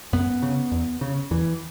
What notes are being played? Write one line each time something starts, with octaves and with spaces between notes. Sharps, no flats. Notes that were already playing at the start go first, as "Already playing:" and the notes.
F#2 B3
C#3
E2
C#3
E2 E3